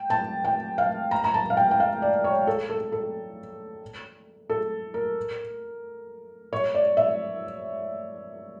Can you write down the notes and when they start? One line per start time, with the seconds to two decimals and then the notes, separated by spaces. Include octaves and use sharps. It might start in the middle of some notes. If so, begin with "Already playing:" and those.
Already playing: G5
0.10 A5
0.44 G5
0.78 F5
1.11 A#5
1.24 A#5
1.34 A5
1.50 F5
1.57 G5
1.71 G5
1.80 F5
2.02 D5
2.24 C#5
2.47 A4
2.69 A4
2.92 A4
4.50 A4
4.94 A#4
6.53 C#5
6.75 D5
6.97 E5